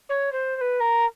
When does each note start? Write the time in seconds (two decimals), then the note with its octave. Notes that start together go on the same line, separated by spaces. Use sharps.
0.09 C#5
0.32 C5
0.56 C5
0.61 B4
0.80 A#4